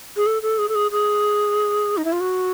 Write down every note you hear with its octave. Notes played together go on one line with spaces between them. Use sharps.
G#4
A4
A4
G#4
A4
G#4
G#4
D#4
E4
F4
F#4